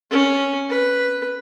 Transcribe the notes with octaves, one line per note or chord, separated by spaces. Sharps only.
C#4
B4